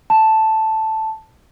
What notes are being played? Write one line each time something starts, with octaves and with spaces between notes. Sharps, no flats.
A5